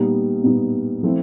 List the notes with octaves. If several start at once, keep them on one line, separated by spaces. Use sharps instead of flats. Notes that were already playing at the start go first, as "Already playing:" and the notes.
Already playing: A#2 G3 B3 D#4
A#2 G3 B3 D#4
F3 A3 C4 E4